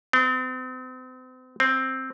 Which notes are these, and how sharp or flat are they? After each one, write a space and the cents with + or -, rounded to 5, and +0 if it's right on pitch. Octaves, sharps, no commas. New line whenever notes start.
C4 -40
C4 +5